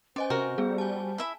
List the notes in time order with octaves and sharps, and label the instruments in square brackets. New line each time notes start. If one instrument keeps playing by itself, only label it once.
[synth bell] C#4 D#5 G#5 [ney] C5 [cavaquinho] D5
[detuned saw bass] C3 [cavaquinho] F#4 A#4
[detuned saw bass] G3 [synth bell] B3 G#4
[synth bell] G#5 A5
[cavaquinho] E4 E5 B5